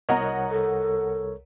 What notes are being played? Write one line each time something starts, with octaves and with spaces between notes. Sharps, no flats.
C2 A#4 C#5 D#5 F#5 A#5
A4